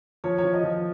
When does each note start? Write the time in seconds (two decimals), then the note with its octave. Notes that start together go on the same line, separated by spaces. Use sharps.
0.24 F3 C#5
0.38 C#5
0.44 F3
0.54 D#5
0.64 F3